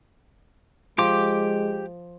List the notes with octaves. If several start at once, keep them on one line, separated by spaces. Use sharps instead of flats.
F3 G#3 G4 G5 D6